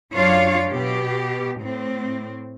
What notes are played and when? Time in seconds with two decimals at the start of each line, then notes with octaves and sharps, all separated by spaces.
0.14 F#2 F#3 D4 F4 C#5 F5
0.68 B2 G4
1.61 A2 C4